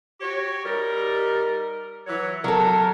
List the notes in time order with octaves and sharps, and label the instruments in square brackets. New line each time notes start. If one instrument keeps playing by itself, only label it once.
[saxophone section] F#4 G4 C#5
G3 D#4 A#4
E3 F#3 C#5
[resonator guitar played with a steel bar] F#3 A4 [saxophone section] A#4